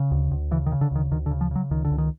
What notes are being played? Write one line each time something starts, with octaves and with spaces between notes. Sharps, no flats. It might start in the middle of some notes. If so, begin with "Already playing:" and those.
Already playing: C#3
D2
D2
C#3 E3
D#3
C#3
D3
D2 D#3
D2 D#3
D3
C#3
F3
C#3 F#3
C#2 D#3
D3
C#2
D#3